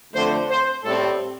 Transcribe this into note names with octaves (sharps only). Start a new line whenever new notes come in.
F2 D3 A3 C4 C5
C5
A2 G3 C4 A4